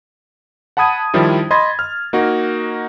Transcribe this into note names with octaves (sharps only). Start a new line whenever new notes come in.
F#5 A5 B5 D#6 G#6 D#7
D#3 F3 G3 D4 E4
D#5 B5 C6 G#6 A6
F6
A#3 D#4 F#4